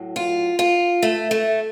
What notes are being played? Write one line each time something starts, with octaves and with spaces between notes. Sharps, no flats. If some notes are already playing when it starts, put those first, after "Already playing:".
Already playing: A2 F#3
F4
F4
A3
A3